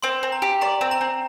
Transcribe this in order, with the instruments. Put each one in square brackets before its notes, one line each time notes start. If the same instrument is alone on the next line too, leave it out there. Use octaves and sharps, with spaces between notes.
[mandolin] C4 [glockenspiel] C6
[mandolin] C4
[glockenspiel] A#5
[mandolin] G4
[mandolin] D5 [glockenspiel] A#5
[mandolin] C4
[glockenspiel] A#5
[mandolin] C4